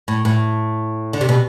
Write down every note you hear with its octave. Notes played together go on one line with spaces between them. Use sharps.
A2
A2
D3
C3
B2